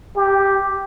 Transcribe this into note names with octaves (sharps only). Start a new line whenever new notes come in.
G4